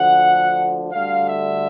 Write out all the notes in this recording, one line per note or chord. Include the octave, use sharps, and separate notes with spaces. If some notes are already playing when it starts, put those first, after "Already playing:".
Already playing: D2 D3 F3 F#5
D2 D3 G3 F5
E5